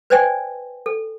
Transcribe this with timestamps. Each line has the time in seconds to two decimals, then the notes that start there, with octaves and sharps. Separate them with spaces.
0.10 B4 C5 D5 D#5 G5 G#5
0.86 A4